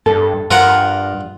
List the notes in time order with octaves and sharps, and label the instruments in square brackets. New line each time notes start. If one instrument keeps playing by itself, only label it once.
[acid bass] G2 [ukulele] A4
[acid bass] G2 [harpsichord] F4 A#4 F#5